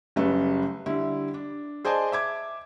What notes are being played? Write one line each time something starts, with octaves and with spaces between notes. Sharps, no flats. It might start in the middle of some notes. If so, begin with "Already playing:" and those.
F#1 C#3 G3 A3 B4
D3 G3 E4
D4
G#4 C5 D5 D#5 G#5 A5
E5 D6 G#6